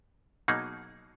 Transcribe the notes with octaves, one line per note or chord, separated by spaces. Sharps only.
B2 F#3 A#3 D#4 G#4